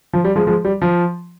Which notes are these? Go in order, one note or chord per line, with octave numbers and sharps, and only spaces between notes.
F3
G3
F3 G#3
F3 G#3
G3
F3